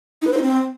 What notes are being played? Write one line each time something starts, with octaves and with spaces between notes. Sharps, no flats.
D#4
B4
C5
D#4
C4